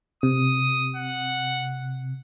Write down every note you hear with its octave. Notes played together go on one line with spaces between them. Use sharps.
C3 D#6
F#5